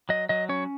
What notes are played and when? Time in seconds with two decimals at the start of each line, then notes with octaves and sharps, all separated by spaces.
0.09 F#3 D#5
0.29 F#3 D#5
0.49 C#4 C#5